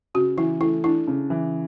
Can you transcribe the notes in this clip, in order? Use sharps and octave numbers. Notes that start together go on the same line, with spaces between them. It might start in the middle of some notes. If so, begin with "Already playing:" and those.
C#3 F#4
E3 E4
A3 E4
D4 E4
C#3
E3